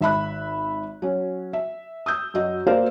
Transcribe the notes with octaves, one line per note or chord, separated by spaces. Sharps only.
G#1 E5 B5 F#6
F#3 C#4
E5
D#6 E6 G6
F#2 F#4 D#5
A#3 A#4 C5 D5 F5